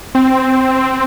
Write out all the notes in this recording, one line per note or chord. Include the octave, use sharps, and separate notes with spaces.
C4